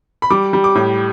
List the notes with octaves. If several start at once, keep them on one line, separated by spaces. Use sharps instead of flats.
B5
G3 D6
G3
D6
A2